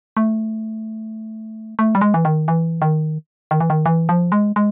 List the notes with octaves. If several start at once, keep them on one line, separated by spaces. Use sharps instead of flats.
A3
A3
G3
G#3
E3
D#3
E3
D#3
D#3
E3
D#3
E3
F3
G#3
G#3